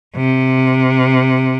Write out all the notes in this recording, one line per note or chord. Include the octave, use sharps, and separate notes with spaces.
C3